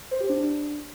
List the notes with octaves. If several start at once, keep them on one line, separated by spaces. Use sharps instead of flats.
C5
G4
D4